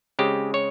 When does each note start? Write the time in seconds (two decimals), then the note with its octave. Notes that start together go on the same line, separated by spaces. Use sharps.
0.19 C#3 G#3 C4 G4
0.54 C#5